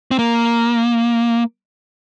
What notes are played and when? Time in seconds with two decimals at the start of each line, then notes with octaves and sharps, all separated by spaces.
0.11 C4
0.19 A#3